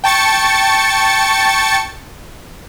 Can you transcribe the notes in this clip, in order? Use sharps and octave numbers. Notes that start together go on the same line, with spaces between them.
G5 A5 C#6 A6 C#7